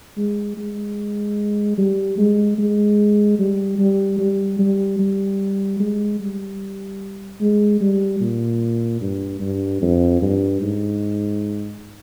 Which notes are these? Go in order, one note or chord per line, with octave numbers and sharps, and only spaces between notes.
G#3
G#3
G3
G#3
G#3
G3
G3
G3
G3
G3
G#3
G3
G#3
G3
A#2
G2
G2
F2
G2
G#2